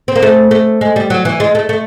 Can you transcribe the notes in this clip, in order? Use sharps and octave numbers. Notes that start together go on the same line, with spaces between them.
C4
A#3
A3
A3
G#3
G3
F#3
E3
G#3
A3
A3